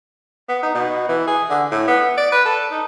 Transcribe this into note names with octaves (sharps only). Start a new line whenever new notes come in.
B3
D#4
B2
E3
G#4
D3
A2
B3
D5
B4
A4
D#4